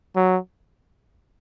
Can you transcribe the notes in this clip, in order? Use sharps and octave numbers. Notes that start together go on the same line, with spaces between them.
F#3